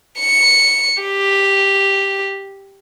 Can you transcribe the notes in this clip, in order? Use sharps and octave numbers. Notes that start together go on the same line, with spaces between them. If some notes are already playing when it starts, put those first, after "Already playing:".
C#7
G4